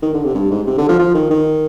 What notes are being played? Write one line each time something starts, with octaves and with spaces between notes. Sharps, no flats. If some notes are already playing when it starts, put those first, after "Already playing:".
D#3
D3
C3
G2
G#2
C3
D3
F3
F3
D#3
D#3